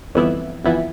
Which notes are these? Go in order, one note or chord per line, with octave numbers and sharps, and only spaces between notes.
G1 F2 E3 B3 E4
G1 F2 E3 B3 E4